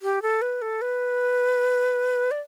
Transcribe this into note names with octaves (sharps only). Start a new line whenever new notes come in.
G4
A4
B4
A4
B4
D5